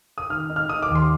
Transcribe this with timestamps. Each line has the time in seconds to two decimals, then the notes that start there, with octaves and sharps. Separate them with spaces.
0.18 D#6
0.30 D#3 F6
0.50 D#4
0.56 F6
0.69 D#4 D#6
0.82 D6
0.89 D#2
0.95 C6